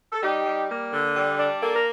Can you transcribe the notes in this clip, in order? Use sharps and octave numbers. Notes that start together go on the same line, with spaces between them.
A4
G3 D#4 G4
G3
A#3
D3
G3
D4
A#3 A4
A#4